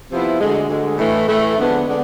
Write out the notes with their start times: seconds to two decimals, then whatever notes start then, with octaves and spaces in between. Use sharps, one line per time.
0.12 C3 F3 B3 E4
0.41 D2 D3 G#3
0.69 D2 D3 G#3
0.98 A2 E3 A3
1.28 A2 E3 A3
1.58 F2 D3 G#3 B3 D4
1.87 D3 G#3 B3 D4